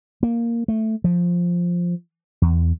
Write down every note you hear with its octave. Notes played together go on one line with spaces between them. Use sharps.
A#3
A3
F3
E2